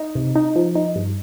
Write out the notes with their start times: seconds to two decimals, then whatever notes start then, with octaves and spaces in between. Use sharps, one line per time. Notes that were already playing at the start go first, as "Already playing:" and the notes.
Already playing: D#4
0.15 C3
0.35 D#4
0.55 F3
0.75 D#4
0.96 G2